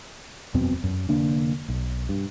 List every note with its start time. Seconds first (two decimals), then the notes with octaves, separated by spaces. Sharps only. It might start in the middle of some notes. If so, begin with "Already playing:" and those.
0.54 E1 F#2 B2 C4
0.84 F#2
1.09 F1 D3 A#3 D4
1.68 B1
2.09 G2